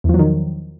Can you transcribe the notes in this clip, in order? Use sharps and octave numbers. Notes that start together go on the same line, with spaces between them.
E2 D#3 F3 F#3